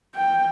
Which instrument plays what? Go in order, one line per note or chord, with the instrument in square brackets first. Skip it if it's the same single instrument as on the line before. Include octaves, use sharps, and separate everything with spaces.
[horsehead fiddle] G5